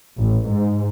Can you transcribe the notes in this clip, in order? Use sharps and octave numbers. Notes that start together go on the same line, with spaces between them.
A1
G#2